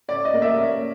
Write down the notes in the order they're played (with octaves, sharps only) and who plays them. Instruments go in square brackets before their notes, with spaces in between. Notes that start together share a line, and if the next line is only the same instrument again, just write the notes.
[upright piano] C#4 D5
D#5
A#3
D5 E5
C#4